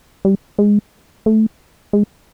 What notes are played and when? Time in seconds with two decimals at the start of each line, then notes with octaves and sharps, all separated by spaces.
0.25 G3
0.58 G#3
1.26 A3
1.93 G#3